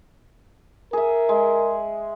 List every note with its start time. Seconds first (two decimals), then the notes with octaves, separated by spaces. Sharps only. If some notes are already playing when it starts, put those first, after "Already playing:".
0.93 G#4 A#4 E5
1.29 G#3